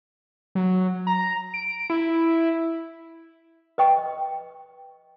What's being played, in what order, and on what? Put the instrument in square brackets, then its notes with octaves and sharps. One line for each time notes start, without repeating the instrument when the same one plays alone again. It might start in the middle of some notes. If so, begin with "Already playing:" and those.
[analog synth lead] F#3
A#5
D7
E4
[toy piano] B4 D#5 G5 C#6